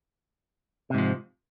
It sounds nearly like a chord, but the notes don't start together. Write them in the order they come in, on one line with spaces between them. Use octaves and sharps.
C3 G#2 F3